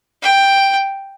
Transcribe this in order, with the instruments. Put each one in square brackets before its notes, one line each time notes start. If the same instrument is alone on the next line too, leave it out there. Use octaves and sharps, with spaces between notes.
[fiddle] G5